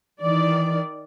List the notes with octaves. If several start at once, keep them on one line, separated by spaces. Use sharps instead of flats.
D#3 E3 D5